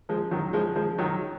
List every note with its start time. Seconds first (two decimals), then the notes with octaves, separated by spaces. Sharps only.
0.09 F3 G#3
0.31 D#3 F#3
0.53 F3 G#3
0.75 F3 G#3
0.98 D#3 F#3